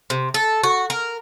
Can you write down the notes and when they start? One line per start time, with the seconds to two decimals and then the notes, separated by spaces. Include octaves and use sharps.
0.10 C3
0.34 A4
0.63 F#4
0.90 A#4